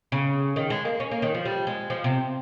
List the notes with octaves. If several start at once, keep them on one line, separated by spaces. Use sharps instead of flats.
C#3
D#3
G#3
A#3
C#4
A#3
D#3
F3
G3
G#3
F3
C3